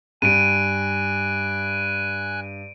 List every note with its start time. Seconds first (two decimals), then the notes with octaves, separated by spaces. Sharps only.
0.22 G2 G#5 F#6 D7 D#7